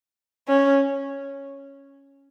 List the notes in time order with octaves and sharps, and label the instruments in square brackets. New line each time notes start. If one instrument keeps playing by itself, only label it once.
[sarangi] C#4